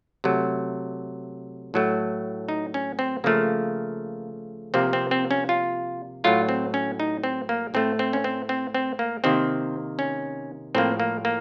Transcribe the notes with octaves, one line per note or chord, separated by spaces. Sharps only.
C3 F#3 A3
A2 F#3 A3
D#4
C#4
C4
C#3 F3 A3 A#3
C3 F3 A#3 C4
C4
C4
C#4
F4
A2 F#3 A3 F4
C4
C#4
D#4
C4
A#3
A2 A3 C4
C4
C#4
C4
C4
C4
A#3
C3 D#3 A#3 C4
C#4
A2 F3 A#3 C4
A#3
A#3